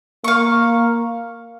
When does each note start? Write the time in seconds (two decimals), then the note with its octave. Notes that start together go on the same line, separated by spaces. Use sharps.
0.24 A#3 F5 C#6